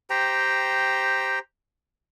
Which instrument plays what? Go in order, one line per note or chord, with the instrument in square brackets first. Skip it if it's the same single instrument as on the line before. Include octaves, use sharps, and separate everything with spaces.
[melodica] G4 C5 G5 A#5